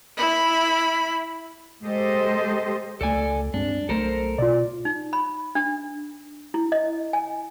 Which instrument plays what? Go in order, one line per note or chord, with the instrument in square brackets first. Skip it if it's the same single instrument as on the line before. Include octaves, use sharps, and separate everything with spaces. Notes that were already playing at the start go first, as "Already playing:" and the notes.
[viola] E4 B5
[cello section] G#3 G4 A4 C5 D#5
[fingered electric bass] C#2 A3 [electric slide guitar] A4 D5 G#5
[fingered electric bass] G2 G#3 C4 [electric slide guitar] D4
[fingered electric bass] B1 A3 [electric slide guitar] A4 A#4 C5
[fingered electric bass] B2 [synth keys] F4 D5
[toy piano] D#4
B5
D4
E4
D#5
G#5